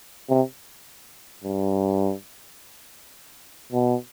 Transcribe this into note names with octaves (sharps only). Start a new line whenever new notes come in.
C3
G2
B2